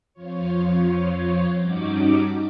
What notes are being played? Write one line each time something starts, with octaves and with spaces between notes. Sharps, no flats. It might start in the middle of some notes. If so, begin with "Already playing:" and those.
F2 F3 F4 C#5
G2 G3 C#4 D#4 F#4 D6